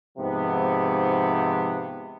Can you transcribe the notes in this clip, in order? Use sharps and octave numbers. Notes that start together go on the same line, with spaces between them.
G#2 C3 F3 B3